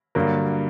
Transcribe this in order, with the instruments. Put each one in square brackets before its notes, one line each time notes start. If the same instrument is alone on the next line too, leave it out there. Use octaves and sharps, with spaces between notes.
[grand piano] G2 D3 F#3 A#3